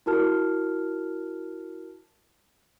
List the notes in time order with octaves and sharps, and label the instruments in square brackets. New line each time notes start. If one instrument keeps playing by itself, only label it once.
[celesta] E4 F#4 A#4 A5 F6